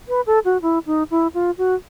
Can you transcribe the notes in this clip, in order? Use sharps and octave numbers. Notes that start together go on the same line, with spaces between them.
B4
A4
F#4
E4
D#4
E4
F4
F#4